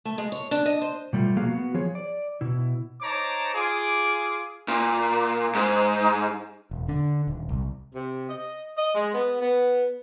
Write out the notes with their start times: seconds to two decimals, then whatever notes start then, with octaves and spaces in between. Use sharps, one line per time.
0.05 A3
0.18 G#3
0.32 C#5
0.51 D4
0.66 D#5
0.81 C5
1.13 B2 G3 A3 F4
1.36 B2 F3 A#3 F#4 G#4 F5
1.50 B3 F#4
1.74 F3 G#4 C#5
1.95 D5
2.41 B2 E4
3.02 D#4 C5 C#5 A5 A#5 D6
3.52 F4 G#4 D6
4.68 A#2
5.55 G#2
6.71 E1
6.88 D3
7.27 D#1
7.49 C2
7.94 C3
8.29 D#5
8.76 D#5
8.94 G#3
9.13 B3
9.41 B3